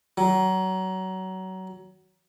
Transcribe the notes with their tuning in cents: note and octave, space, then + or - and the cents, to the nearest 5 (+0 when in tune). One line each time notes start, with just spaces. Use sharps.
F#3 +25